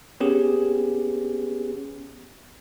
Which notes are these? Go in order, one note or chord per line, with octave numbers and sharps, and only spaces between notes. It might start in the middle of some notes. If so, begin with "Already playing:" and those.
B3 C#4 G4 G#4